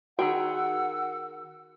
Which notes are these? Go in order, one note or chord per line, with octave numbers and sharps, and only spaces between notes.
D#3 F#4 G#4 F#5 G5 E6